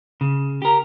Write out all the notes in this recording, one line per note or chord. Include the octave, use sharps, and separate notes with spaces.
C#3
G4 A#4